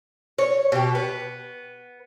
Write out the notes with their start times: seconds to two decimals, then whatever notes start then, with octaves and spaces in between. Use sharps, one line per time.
0.38 C#5
0.72 B2 G4
0.95 B3